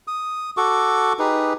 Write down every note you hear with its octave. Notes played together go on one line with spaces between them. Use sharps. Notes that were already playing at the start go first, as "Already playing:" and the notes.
D#6
F#4 A4 C#6 D6
D#4 G4 G#4 B4